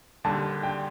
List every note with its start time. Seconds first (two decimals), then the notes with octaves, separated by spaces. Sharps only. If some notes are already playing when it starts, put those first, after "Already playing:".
0.24 D#2 D3 G3 A5
0.63 G5